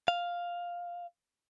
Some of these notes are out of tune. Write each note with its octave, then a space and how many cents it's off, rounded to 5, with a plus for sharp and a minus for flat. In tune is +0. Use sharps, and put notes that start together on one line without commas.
F5 +5